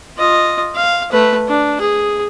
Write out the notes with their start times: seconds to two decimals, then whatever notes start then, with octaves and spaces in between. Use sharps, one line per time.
0.18 F4 D#5
0.76 F5
1.12 A3 B4
1.49 D4
1.81 G#4